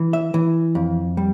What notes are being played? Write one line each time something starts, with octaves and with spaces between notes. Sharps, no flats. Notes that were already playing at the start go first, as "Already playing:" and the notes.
Already playing: E3
E5
E3
F2
G3